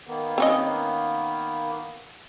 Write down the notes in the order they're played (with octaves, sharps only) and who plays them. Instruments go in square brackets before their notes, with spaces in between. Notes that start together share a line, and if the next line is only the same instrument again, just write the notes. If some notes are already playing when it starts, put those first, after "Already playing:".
[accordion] D#3 A#3 B3
[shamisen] C4 C#4 D#5